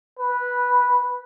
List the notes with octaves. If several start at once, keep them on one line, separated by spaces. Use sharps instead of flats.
B4